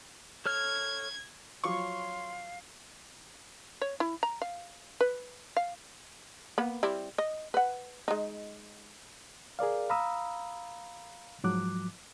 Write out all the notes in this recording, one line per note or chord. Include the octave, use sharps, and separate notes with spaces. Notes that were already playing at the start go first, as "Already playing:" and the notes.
A4 C#5 F6 G#6
F3 F#3 C#5 F5 C6 C#6
C#5
E4
A#5
F5
B4
F5
A#3 B3 B5
G3 C4 E4
D#5
B4 F#5
G#3 D#4
G#4 A#4 D5 F5
F5 A#5 B5 D#6 E6
G#2 F3 F#3 D6 F#6